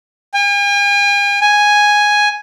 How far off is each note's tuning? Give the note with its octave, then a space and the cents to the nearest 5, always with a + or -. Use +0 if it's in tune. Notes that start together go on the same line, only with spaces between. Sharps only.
G#5 -45
G#5 +0